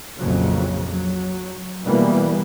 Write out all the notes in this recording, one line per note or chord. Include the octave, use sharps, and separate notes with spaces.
A#1 F2 C#3 F#3
F#3
B2 E3 G3 A#3 B3